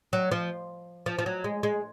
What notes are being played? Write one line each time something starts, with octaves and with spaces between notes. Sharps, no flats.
F#3
F3
F3
F3
F#3
G#3
G#3